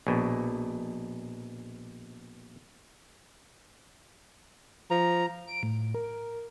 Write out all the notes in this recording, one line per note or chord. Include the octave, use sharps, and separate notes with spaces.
A#1 B2
F3 A#5
D7
A2
A#4